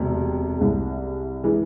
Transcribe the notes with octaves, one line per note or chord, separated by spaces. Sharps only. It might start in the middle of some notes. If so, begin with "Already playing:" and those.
Already playing: E1 D2 C3
C2 C3 G#3
E3 G#3